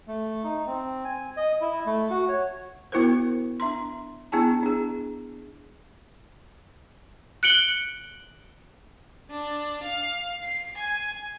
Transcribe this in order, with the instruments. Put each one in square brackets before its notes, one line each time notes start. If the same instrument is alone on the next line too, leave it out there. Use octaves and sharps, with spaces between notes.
[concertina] A3
D#4
C4
G#5
D#5
E4
A3
F#4
C#5
[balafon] B3 E4 F#4 A#4 C5
D4 E5 A#5 C6
B3 D4 E4 G#4 G#5 A5
D4 G#4
[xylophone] F#6 C#7 D7 F#7 G7
[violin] D4
F5
C7
G#5